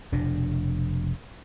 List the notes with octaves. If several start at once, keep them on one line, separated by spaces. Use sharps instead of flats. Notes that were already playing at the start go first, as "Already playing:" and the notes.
F1 B2 D4